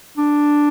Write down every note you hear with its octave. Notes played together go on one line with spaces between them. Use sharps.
D4